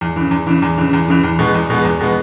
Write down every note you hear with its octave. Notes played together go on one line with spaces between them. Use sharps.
E2
C#3 E3
E2
C#3 E3
E2
C#3 E3
E2
C#3 E3
E2
B2 G#3 B3
E2
B2 G#3 B3
E2
B2 G#3 B3